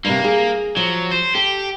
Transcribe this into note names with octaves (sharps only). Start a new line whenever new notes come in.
G2 C3 A#3
G#4
F3 F#3
C5
G4 A4